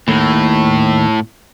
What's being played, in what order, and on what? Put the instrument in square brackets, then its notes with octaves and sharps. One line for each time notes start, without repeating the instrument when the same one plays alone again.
[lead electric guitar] D#2 [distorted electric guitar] A2